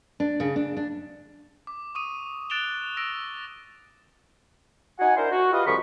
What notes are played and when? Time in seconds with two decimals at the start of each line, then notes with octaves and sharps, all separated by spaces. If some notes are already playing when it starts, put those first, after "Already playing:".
0.20 D4
0.40 C#3
0.56 D4
0.77 D4
1.67 D6
1.95 C#6 D#6 D#7
2.50 F#6 A6 D7 E7 F7 G7
2.97 E6 A#6 D7
4.99 D#4 F#4 F#5 G#5
5.16 D4 E4 A#4 C5
5.31 F#4
5.52 F4 G4 B4 D#5 F5
5.65 C2 C#3 F3 A#4 B5 C#6